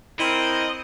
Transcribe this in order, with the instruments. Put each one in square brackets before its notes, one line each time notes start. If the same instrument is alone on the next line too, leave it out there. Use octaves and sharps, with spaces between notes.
[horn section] C4 A#4 [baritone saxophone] E4 [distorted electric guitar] D#5